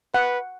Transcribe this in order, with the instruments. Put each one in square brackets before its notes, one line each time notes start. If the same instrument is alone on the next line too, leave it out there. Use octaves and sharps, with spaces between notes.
[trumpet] B4 [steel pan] F#5